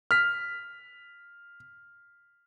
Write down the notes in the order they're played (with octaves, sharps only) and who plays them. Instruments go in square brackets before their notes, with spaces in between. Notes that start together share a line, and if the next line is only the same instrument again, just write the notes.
[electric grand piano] F6 B6